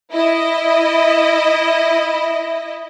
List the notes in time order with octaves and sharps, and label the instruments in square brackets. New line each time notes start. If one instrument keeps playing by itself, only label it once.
[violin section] E4 D#5